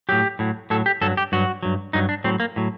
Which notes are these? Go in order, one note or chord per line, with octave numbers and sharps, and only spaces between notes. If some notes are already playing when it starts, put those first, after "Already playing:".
A2 F#3 G4
A2 F#3
A2 F#3 A4
G4
G2 F#3 A4
G4
G2 F#3 F#4
G2 F#3
G2 F#3 D#4
D4
A2 F#3 C4
A#3
A2 F#3